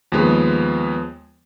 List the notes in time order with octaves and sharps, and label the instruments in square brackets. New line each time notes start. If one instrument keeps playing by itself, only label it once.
[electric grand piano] D#2 F3 G#3 B3